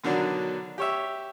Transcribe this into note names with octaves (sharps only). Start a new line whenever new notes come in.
B2 D3 D#3 F#3 D4
G4 C#5 E5